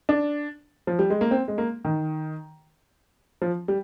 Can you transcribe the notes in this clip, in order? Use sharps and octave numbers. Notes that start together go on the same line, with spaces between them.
D4
F3
G3
G#3
A#3
C4
G#3
A#3
D#3
F3
G3